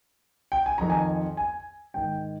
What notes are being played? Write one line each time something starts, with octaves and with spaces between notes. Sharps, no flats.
G5
G#5
F2 D#3 A#5
G#5
G#5
G#2 D#3 G5